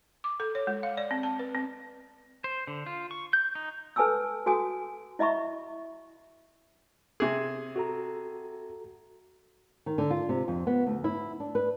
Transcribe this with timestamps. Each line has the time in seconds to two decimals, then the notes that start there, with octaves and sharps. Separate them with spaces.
0.24 D6
0.40 A4
0.55 C#5
0.67 G#3
0.83 F5
0.97 D5
1.11 C4
1.23 A5
1.39 B4
1.54 C4
2.44 C5
2.67 D3
2.86 F4
3.11 C#6
3.33 G6
3.55 D#4
3.96 A4 B4 G#5 A5 D#6 E6
4.46 F#4 A4 G#5 D#6
5.19 E4 D#5 E5 B5 C#6
7.20 C3 G#4
7.76 F#4 A4 A#5
9.86 D#3
9.98 D3
10.11 F4
10.29 C3
10.48 F2
10.67 B3
10.87 D2
11.04 E4
11.40 D4
11.55 B4